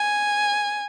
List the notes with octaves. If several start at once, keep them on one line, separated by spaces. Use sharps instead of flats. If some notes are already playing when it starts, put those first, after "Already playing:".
Already playing: G#5